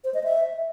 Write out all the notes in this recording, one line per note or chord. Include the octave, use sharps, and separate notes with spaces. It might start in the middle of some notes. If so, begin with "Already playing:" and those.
C5
D#5
E5